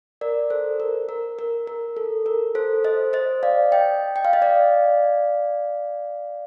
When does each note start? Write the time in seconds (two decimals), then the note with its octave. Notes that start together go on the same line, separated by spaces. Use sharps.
0.21 A#4 D5
0.50 A4 C5
0.80 A#4
1.09 A#4
1.39 A#4
1.67 A#4
1.96 A4
2.26 A#4
2.55 A4 C5
2.84 C5 D#5
3.13 C5 D#5
3.43 D5 F5
3.72 D#5 G5
4.16 G5
4.25 F5
4.33 D#5
4.42 D5 F5